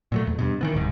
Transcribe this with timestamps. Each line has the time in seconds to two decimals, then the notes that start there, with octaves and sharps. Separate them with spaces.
0.12 A#2 F#3 A3
0.27 E2
0.39 G2 B2
0.61 D#3 E3 B3
0.73 D1 C2 G#2